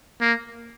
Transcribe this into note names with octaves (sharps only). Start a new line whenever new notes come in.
A#3